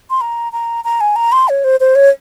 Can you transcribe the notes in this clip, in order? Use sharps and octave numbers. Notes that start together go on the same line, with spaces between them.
C6
A#5
A#5
A#5
G#5
A#5
C6
C#5
C5
C5
C#5